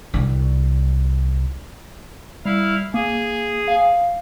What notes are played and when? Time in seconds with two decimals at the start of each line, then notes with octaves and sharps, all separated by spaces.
0.14 C2 D4
2.45 G3 E4 F5
2.94 A#3 G#4
3.68 F5